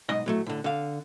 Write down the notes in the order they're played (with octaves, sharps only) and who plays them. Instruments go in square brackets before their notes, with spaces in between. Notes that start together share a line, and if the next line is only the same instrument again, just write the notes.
[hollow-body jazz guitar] B1 G#2 D#5
A2 F#3 A3
A2 D3
D3 F5